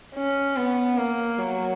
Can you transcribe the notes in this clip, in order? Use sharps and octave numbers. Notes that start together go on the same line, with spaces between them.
C#4
B3
A#3
F#3